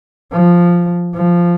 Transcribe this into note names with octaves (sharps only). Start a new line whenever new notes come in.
F3
F3